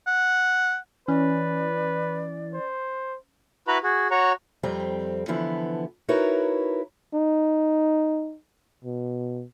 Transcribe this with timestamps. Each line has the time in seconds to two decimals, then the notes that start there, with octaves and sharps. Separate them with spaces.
0.07 F#5
1.08 E3 C#4 B4 D5
2.54 C5
3.68 E4 F#4 B4 A#5 B5
3.83 F#4 G#4
4.11 F#4 C#5 F#5 A#5 C#6
4.63 F2 G3 C4 A#5
5.28 D3 E3 F3 B3 E4
6.08 D#4 E4 F#4 A#4 B4 C#5
7.14 D#4
8.84 B2